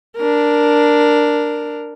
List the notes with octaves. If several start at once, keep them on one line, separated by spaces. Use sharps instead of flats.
D4 A#4